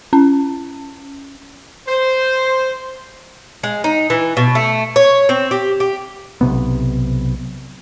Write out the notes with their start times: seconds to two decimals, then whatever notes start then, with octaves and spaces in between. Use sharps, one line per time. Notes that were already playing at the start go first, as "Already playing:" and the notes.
0.13 C#4
1.88 C5
3.63 G#3
3.84 D#4
4.10 E3
4.37 B2
4.55 A3
4.96 C#5
5.29 C4
5.51 G4
5.80 G4
6.41 B1 C3 B3